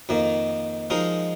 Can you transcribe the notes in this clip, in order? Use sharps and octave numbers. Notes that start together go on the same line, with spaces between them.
F2 D#3 A#3
F3 G#3 D#4 A#4